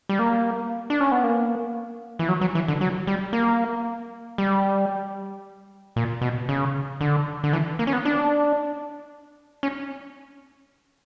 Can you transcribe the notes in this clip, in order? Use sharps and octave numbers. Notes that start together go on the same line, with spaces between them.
G3
A#3
D4
C#4
B3
A#3
E3
F#3
F#3
E3
D3
F#3
G3
A#3
G3
A#2
B2
C#3
D3
D3
E3
A#3
C#4
B3
D4
C#4